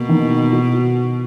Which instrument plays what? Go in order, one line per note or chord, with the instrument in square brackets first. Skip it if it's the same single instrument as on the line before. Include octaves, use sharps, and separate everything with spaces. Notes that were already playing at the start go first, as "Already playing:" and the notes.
Already playing: [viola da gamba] B2 [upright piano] A#3
[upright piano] D#3
F#4